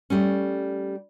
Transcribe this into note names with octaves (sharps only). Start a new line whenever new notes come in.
G3 A3 C#4